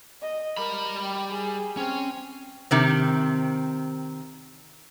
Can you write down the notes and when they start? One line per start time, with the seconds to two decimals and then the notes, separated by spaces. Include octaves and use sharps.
0.22 D#5
0.57 G3 A#4 B5
1.02 G5
1.32 G#4
1.77 C4 C#4
2.71 C3 D#3 C4